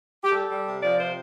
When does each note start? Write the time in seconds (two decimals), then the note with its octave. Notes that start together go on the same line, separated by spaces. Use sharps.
0.24 G4
0.32 G3 A4
0.49 G3
0.65 C3
0.81 F3 D5
0.98 C3 C5